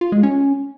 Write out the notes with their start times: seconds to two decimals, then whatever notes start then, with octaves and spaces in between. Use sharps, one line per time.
0.01 F4
0.12 G#3
0.23 C#4